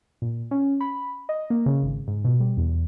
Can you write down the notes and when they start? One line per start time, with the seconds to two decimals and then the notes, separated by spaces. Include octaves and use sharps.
0.22 A#2
0.51 C#4
0.81 B5
1.29 D#5
1.50 A#3
1.66 C#3
1.83 G#1
2.07 G#2
2.25 B2
2.40 G3
2.57 E2